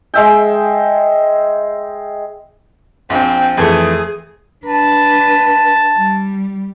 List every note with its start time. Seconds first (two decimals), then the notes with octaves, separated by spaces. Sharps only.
0.14 G#3 E5 G5
3.10 A#1 C4
3.57 F2 E3 A3 G#4
4.65 D4 B4 A5
5.95 G3